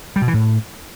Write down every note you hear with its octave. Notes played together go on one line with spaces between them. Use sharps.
G3
B2
E3
A2